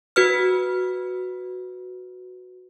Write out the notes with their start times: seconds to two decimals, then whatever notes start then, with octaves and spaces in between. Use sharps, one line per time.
0.16 F#4 B4 F6